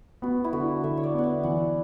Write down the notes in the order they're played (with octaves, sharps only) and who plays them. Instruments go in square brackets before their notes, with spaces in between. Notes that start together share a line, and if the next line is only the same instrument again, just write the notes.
[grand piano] B3 [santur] F#4
[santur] E4
[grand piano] D3 [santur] F#4
[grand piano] D3 [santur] E5
[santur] C#5
D5
[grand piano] B3 [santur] F#5
[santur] E5
[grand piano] E3 [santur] F#5